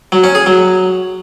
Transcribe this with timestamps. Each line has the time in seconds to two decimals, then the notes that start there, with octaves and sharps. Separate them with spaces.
0.12 F#3
0.24 C#4
0.35 G#4
0.46 F#3